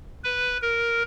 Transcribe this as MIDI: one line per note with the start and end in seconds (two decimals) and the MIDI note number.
0.24 0.57 71
0.62 1.03 70